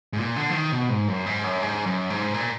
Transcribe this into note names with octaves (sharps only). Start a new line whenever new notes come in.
G#2
A#2
D3
F3
D#3
B2
G#2
F#2
G#2
F#2
G#2
F#2
G#2
A#2